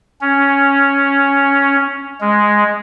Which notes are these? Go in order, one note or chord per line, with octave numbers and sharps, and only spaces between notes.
C#4
G#3